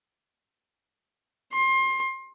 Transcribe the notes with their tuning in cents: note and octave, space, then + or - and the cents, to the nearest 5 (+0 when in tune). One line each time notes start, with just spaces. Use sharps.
C6 +25